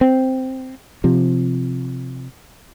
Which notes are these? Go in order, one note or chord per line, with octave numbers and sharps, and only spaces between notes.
C4
C3 F3